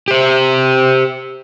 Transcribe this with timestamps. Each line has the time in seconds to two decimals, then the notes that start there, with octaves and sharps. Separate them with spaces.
0.08 G4 C5